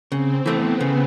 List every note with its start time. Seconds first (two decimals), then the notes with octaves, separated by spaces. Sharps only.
0.12 C#3 C4
0.46 E3 A3 B3 C4
0.81 C#3